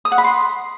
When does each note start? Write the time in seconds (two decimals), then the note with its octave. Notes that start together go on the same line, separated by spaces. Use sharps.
0.05 D#6
0.12 F#5
0.18 B5
0.24 C6